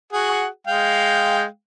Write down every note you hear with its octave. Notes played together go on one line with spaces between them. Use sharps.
F#4 G#4 F#5
G#3 F5 G5